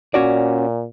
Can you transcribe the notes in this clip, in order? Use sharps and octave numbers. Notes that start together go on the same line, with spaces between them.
A#2 C#4 F#4 D5